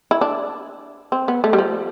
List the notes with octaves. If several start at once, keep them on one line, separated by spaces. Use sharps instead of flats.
E4
D4
C4
B3
A3
G3
F3